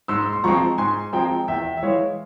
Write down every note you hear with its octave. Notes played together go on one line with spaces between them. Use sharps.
G#2 C6 E6
C6
F3 G#3 C4 A#5 C#6
G#2 G#5 C6
F3 G#3 C4 G5 A#5
E2 E5 G5
E5
E3 G#3 C#5 F5